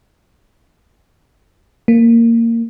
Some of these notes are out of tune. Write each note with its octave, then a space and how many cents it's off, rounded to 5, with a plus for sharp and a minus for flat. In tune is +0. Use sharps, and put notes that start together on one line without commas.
A#3 -15